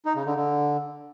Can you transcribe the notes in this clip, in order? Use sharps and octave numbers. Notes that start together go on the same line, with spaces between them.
D#4
C#3
D3
D3